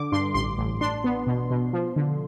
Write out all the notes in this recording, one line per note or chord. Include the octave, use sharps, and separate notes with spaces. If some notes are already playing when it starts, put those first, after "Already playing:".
Already playing: D3 D6
G2 C6
A1 C6
A1
D4 C6
B3
B2
B2
F3
D3